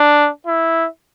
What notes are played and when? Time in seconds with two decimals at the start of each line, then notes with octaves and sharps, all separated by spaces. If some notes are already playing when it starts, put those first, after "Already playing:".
Already playing: D4
0.47 E4